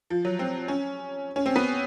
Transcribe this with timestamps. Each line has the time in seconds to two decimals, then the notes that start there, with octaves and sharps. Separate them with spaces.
0.10 F3
0.25 F#3
0.39 C4
0.68 C#4
1.36 C#4
1.46 C4
1.56 B3